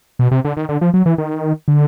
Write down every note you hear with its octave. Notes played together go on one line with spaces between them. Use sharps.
B2
C3
D3
D#3
D3
F3
F#3
E3
D#3
D3